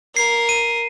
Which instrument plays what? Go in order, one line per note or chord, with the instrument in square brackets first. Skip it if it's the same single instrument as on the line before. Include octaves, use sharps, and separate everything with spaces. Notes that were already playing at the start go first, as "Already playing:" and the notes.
[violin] A#4 [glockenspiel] C7
[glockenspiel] D#7